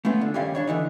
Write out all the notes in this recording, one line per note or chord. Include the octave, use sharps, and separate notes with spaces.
A3 B3 C#4 F4
D3
G2 A#2 D#3 G3 C#4 F5
E2 D4 C#5
B1 D3 E3 D#4